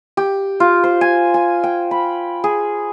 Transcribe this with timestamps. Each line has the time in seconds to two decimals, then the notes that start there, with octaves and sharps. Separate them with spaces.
0.17 G4
0.60 F4
0.84 C5
1.01 G#5
1.34 G#5
1.64 G5
1.91 B5
2.44 G#4